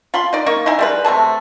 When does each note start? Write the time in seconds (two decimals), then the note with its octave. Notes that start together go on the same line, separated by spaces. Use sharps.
0.14 F4 B5 C6
0.33 D#4 D5
0.46 A#3 D#4 C#6
0.66 D#4 E4 G#5
0.79 G3 G#3 B4
1.04 C3 A3 G#4 A5